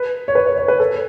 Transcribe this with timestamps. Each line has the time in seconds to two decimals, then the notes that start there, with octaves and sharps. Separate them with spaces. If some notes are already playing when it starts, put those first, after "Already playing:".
Already playing: B4
0.28 C#5
0.35 B4
0.47 C#5
0.58 C#5
0.68 B4
0.80 A4